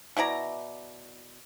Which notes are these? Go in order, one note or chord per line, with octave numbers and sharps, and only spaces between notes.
B2 E4 D5 A#5